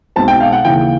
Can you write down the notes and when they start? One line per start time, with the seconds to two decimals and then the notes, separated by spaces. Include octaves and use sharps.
0.16 B1 B2 G#3 C4 A5
0.28 G5
0.41 F5
0.52 F#5
0.65 D#2 C#3 E3 G5